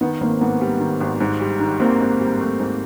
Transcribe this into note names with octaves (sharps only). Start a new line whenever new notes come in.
D#3 B3
G#1 A#3 C4
G#2 B3
G3
D#3
G#1
G#2
G3
D#3
G#1 A#3 C4
G#2
G3
A3
G#2